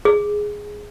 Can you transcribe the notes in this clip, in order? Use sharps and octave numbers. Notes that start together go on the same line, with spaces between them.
G#4